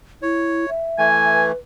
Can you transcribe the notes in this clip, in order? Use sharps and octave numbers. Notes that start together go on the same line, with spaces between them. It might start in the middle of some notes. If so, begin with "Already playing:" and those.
E4 C#5
E5
E3 A3 G#5
B4